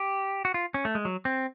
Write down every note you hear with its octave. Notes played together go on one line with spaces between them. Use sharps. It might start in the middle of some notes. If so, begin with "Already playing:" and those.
Already playing: G4
F#4
F4
C#4
A3
G#3
F#3
C4